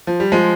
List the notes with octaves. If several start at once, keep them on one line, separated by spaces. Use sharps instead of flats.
F3
G3
F3 G#3